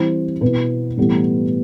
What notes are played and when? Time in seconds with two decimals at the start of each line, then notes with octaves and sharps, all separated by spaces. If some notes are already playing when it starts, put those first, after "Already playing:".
Already playing: E3 G3 C4 E4 C5
0.41 B2 B3 E4 B4
0.97 A2 E3 G3 B3